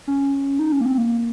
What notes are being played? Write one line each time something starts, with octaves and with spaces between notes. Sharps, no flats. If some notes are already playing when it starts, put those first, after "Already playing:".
C#4
D#4
C#4
A#3
C4
A#3